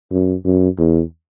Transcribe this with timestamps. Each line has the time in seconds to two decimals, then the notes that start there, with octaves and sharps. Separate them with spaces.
0.11 F#2
0.45 F#2
0.78 E2